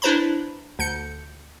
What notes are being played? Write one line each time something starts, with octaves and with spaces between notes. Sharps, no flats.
D4 E4 B4 C5 A#5 B5
D2 G6 C#7